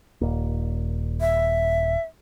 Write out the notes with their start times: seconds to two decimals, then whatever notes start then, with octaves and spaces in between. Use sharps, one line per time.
0.21 D#1 A#3
1.21 E5